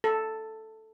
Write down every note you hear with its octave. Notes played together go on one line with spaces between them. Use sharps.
A4